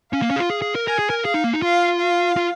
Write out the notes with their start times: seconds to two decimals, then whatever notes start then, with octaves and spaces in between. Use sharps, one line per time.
0.12 C#4 F5
0.22 A#3
0.30 C#4
0.36 G#4
0.40 F4
0.50 G#4
0.62 G#4
0.75 A#4
0.87 A#4 G#5
0.99 G#4
1.10 A#4
1.24 G#4 F5
1.34 D#4
1.44 A#3
1.53 D#4
1.62 F4 F5
2.00 F5
2.37 F4